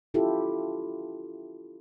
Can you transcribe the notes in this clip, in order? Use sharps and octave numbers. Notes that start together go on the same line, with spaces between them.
C#4 E4 F4 G4 A4